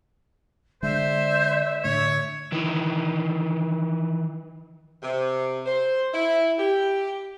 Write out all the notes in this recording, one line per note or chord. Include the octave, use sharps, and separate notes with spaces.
D3 G#3 C5 D5 E5
A2 D3 A3 C#5
D#3 E3
C3
C5
E4
G4